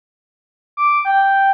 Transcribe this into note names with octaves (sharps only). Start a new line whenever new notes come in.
D6
G5